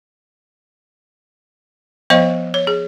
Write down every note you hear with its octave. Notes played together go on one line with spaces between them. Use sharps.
F3 B3 C5 D#5 F5
C#5
G#4